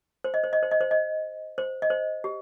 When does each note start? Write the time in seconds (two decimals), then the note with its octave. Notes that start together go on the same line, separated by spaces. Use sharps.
0.24 C5
0.34 D#5
0.44 C5
0.53 D#5
0.63 C5
0.71 D#5
0.81 C5
0.91 D#5
1.58 C5
1.82 D#5
1.90 C5
2.24 G4